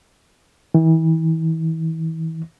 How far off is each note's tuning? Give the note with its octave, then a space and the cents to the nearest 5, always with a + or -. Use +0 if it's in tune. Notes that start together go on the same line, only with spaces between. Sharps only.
E3 -35